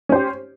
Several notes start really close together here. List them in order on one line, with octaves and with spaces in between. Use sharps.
C#4 C5 G4